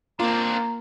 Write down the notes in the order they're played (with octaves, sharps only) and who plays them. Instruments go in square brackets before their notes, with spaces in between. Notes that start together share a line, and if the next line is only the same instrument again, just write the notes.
[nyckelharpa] A#3 [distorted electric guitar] C4 D4 [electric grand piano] F4 [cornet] A#5